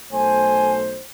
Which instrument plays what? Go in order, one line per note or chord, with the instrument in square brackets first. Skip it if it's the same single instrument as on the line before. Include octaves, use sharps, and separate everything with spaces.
[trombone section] B1 A3 C5 [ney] G#5